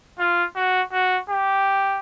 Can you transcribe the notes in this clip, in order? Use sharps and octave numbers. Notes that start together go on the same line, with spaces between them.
F4
F#4
F#4
G4